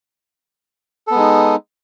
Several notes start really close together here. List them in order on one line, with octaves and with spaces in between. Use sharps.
A4 B3 G#3 D#4